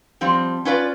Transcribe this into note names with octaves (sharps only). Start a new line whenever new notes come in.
F3 G3 C4
C#4 F4 B4 D5